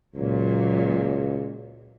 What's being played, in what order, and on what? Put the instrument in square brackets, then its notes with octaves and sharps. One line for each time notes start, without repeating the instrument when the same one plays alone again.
[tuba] C#2 [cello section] A#2 F#3